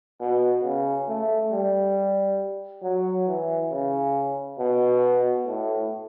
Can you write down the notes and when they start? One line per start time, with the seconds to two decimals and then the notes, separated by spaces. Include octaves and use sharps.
0.20 B2
0.63 C#3
1.08 A3
1.52 G3
2.83 F#3
3.27 E3
3.72 C#3
4.59 B2
5.46 A2